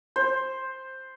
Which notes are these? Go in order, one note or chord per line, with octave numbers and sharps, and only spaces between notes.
C5